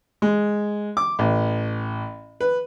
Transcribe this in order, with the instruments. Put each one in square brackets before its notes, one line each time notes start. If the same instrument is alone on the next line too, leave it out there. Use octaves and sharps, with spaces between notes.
[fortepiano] G#3
D6
A1
B4